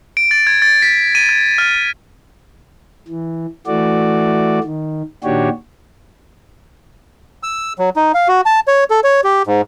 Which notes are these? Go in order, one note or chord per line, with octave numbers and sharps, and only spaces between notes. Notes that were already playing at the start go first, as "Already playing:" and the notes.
D7
A6
G#6
A6
B6
D#7
G#6
F6
E3
E3 A3 F#4 D5
D#3
A#2 D#3 D4 F#4 G4 C#5
E6
F#3
D#4
F5
F#4
A5
C#5
A4
C#5
G4
G#2